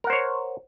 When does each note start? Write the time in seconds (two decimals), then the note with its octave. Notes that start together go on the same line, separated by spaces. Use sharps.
0.04 A#4
0.07 F#5
0.10 C5
0.13 C#5